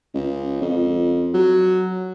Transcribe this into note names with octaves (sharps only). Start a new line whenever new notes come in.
C#2
F2
F#3